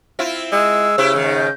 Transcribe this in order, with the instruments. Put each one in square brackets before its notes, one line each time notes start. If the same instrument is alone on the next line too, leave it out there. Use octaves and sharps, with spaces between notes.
[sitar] C4 E4 F4
[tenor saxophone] G#3 [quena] E6
[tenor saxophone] C#3 [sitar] E4 G4 C5
[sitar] G#2 D#3
[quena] G6